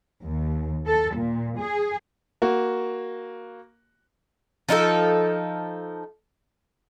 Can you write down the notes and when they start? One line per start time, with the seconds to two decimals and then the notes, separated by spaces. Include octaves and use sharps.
0.23 D#2
0.87 A4
1.16 A#2
1.60 G#4
2.42 A#3 F#4
4.69 F3 D#4 E4 A4